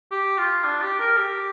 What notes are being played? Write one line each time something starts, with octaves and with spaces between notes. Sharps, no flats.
G4
F4
D4
G4
A#4
G4